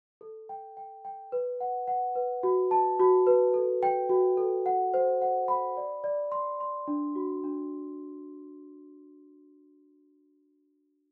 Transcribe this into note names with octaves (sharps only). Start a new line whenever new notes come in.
A4
G5
G5
G5
B4
F#5
F#5
B4
F#4
A5
F#4
B4
A4
G5
F#4
A4
F#5
C5
F#5
B5
D5
D5
C6
C6
D4
F#4
D4